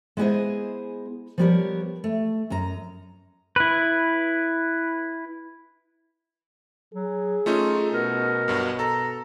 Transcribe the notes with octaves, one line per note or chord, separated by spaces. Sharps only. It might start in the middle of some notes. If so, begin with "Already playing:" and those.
G#3 B3 E4 G#4 C5 D#5
F3 G3 B3 G4 A#4 C#5
A3
F#2 D#5 A#5
E4 B4
F#3 G#4
A3 C#4 D#4 F4
B2 A#4
B1 G2 F#3
A4 A#5